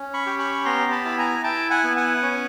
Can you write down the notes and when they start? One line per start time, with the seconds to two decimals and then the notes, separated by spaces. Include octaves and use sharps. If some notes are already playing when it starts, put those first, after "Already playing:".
Already playing: C#4
0.14 B5 C#6
0.26 G4
0.39 B5 C#6
0.65 B3 A#5 C6
0.92 A5 B5
1.05 E4 B5
1.18 G#5 A#5
1.44 E4 G5 A5
1.70 F#5 G#5
1.84 B3
1.97 F#5 G#5
2.22 C#4